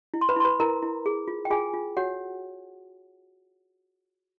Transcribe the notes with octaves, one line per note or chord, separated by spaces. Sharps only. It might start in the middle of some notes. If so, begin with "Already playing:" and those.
E4
C6
B4 B5
E4 C6
B4 B5
E4 A#4 A#5
E4
G#4
F4
G5
F4 G#4 G#5
F4
F#4 C#5 F#5